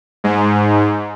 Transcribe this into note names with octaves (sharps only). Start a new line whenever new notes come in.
G#2